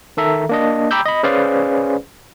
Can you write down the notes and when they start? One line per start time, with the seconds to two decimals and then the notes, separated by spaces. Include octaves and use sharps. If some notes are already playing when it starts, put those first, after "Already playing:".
0.17 D#3 A4 E5 A#5
0.49 A#3 D4 D#5
0.91 G5 A#5 B5 D6 E6 G6
1.06 D#5 B5
1.23 C#4 G#4 B4 C5 D5 F5